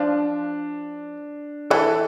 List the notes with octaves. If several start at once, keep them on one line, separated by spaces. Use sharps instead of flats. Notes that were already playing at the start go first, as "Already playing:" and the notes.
Already playing: F3 D4 F4
E3 E4 A4